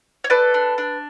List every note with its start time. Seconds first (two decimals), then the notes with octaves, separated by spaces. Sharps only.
0.24 C#5
0.30 A4 B4 D5
0.54 D4
0.78 D4